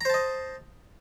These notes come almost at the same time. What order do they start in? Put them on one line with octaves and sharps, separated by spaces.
A#5 C5 A5 D#5